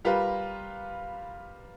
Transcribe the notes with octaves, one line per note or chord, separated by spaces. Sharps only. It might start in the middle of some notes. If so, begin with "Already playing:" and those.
G3 F4 G4 A#4 B4